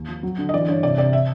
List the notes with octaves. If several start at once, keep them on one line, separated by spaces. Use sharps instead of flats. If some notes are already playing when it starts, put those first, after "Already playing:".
Already playing: D#2
F3
F#3
D3
D#5
E3 D5
G2 C#5
C3 D5
C3 D5
E5